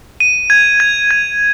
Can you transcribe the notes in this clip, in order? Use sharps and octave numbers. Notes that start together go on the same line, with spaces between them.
D#7
G#6
G#6
G#6